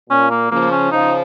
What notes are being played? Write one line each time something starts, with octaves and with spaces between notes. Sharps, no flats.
A#2 C#4
A#3
C#3 F3 A#3
C#4
C#3 F3 D#4